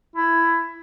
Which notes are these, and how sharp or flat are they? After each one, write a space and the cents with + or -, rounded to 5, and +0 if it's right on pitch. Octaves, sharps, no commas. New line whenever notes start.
E4 +15